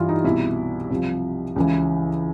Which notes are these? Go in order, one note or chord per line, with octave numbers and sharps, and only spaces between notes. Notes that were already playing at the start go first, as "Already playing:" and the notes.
Already playing: G2 E3 F4
D#4
C2 B2 E4
C2 C3 F3
C#2 C#3 E3